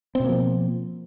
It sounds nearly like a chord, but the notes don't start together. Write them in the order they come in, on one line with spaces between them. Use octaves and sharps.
C4 B2 A#3 F3